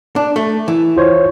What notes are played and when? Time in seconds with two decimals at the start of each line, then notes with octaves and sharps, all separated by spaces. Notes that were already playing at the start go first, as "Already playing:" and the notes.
0.16 D4
0.36 A3
0.68 E3
0.96 F4 C5 C#5